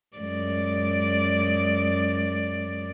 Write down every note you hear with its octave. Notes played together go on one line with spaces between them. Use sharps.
F#2 G#3 D5